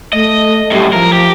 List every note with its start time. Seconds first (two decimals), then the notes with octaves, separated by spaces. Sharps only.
0.13 A3 D#5
0.71 F#2 A2 G3
0.93 F3 A#4
1.13 G4